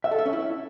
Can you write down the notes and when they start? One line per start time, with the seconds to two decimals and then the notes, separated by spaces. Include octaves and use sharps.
0.04 E5
0.11 A4
0.19 E5
0.26 C#4
0.33 E4